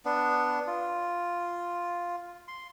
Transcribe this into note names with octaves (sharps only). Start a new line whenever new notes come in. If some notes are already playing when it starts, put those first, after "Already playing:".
B3 D4
F4
C6